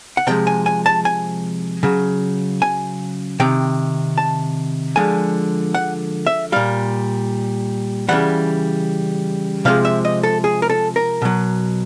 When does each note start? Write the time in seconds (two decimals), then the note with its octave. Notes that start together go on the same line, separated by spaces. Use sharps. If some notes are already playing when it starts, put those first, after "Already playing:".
0.17 F#5
0.27 C3 F3 G#3 G5
0.47 G#5
0.66 G#5
0.86 A5
1.05 G#5
1.83 C#3 F#3
2.62 G#5
3.40 C3 D#3 G5
4.18 A5
4.96 D3 F3 G#3 G#5
5.75 F#5
6.27 E5
6.52 A#2 G3 F5
8.09 C#3 E3 G3 F#5
9.65 C3 F3 G#3 F5
9.85 E5
10.05 D#5
10.23 A4
10.44 G#4
10.62 A#4
10.69 A4
10.96 A#4
11.22 B2 F#3